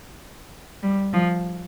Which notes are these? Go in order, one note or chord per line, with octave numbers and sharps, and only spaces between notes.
G3
F3